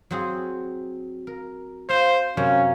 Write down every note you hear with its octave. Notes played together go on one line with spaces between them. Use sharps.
F#3 C4 G#4
A#4
C5 F5
F#2 C3 A#3 C#4